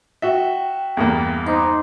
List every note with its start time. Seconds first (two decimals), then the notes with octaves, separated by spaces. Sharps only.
0.22 F#4 E5 G5
0.97 E2 G2 A#3
1.47 D#4 C5 C6 D6